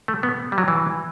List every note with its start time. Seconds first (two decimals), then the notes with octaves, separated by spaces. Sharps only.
0.08 A3
0.23 B3
0.52 G3
0.58 F#3
0.68 E3